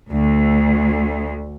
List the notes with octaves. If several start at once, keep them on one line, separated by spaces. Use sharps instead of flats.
D2